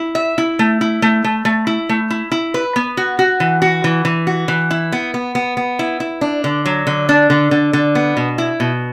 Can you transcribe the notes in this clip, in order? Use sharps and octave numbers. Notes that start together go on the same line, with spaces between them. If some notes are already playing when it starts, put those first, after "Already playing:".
Already playing: E4
E5
E4
A3
E4
A3
A3
A3
E4
A3
E4
E4
B4
B3
F#4
F#4
E3
F#4
E3
E3
F#4
E3
E4
B3
B3
B3
B3
E4
E4
D4
D3
F#3
D3
D4
D3
D3
D3
B3
B2
E4
B2